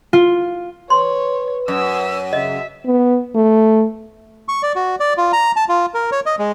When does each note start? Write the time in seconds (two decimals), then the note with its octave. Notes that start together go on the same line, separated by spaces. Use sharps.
0.13 F4
0.90 B4 C#5 C6
1.68 F#2 E6
2.33 C#3 D#5 E5
2.86 B3
3.35 A3
4.48 C#6
4.63 D5
4.76 F#4
5.00 D5
5.17 F4
5.33 A#5
5.56 A5
5.69 F4
5.94 A#4
6.12 C#5
6.26 D#5
6.39 G#3